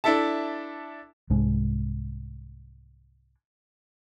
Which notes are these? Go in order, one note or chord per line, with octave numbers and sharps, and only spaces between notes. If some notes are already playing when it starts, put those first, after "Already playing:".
D4 E4 A4 E5 A5
C2 G#2 G#3 D4